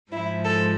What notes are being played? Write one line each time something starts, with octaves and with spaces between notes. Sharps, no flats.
G#2 F3 G#3 E4
A4